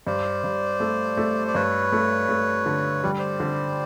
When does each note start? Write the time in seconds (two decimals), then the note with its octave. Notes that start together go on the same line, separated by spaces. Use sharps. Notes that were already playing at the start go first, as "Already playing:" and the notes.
0.07 G2 C5 D5
0.44 G2
0.80 A3
1.17 A3
1.48 D5
1.55 G2 B4 C#5
1.92 A3
2.29 A3
2.66 D3
3.04 G3 D5
3.19 C5 D5
3.40 D3